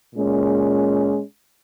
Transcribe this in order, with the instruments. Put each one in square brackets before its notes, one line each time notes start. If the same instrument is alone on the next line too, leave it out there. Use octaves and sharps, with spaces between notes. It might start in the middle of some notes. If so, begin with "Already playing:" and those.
[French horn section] A#2 G#3 C#4